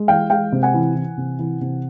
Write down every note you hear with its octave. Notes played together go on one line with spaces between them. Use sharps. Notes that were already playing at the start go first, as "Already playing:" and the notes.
Already playing: G#3
E3 F5 G5
G#3 F5 G5
C3
F#5 G#5
E3
E3
C3
E3
C3